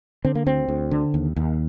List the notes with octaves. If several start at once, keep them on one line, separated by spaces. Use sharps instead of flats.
D3 C4
A#3
D2 C4
D2
D3
D#2
D#2